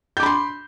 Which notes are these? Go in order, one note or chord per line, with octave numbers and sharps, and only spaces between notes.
B5 C6 D6 G6